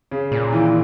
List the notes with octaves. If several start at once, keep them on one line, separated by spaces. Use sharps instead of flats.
C#3
A#2
D#3 E3